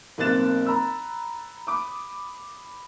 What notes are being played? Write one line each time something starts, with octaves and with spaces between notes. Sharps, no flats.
B1 A#3 C4 F#6 A6 E7
A#5 B5 E6
B5 D6 D#6